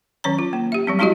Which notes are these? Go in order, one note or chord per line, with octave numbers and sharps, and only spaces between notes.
D#3 F#3 C#4 C#5 A#5
F4
A#3
G4 E5
F#3 G3 C4
G#3 C4 E4 F#4 G4 D#5